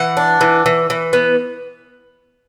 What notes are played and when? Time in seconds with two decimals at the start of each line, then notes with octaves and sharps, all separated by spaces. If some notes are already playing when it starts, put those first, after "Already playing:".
Already playing: E3 F#5
0.17 D4
0.41 E3
0.66 E3
0.90 E3
1.13 B3